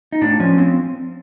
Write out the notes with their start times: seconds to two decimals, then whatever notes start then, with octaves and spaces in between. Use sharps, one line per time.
0.12 D#4
0.21 A2 D4
0.40 F3 C#4
0.58 F3 C4